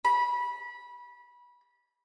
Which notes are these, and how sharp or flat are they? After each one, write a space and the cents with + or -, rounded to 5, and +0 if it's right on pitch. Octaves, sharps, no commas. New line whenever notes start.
B5 -20